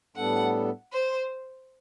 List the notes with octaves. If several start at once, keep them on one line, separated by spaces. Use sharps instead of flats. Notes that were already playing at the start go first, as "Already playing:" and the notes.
A2 G3 B3 D4 A4 F#5
C5